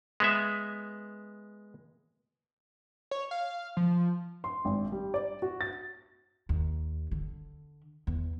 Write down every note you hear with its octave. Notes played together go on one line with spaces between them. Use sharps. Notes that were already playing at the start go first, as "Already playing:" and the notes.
G#3 B3 E5
C#5
F5
F3
C6
G#1
G3
D5
F#4
A6
D#2
D3
E2